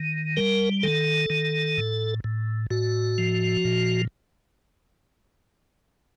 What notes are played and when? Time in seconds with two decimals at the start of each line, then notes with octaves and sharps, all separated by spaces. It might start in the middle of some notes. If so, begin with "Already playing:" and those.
Already playing: D#3
0.37 G3 A#4
0.83 D#3 A4
1.30 D#3
1.77 A2
2.24 A2
2.71 A2 F#4
3.18 F3
3.65 A#2